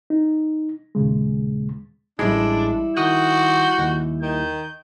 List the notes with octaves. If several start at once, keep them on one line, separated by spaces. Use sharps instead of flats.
D#4
D#2 A#2 C#3 G#3
A1 G3 G#3 D4 E4
D#3 F#4 D#6 F#6 G6
D#2
D#3 G6